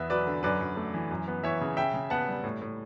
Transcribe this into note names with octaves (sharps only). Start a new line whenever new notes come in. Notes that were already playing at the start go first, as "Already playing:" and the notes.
Already playing: E2 B3 E5
F#3 B4 D5
D3
F#2 B4 D5
F#2
A3
E3
F#2
B3
E3 C#5 E5
C#3
C#3 E5 G5
C#3
B3 F#5 A5
G3
A2
A2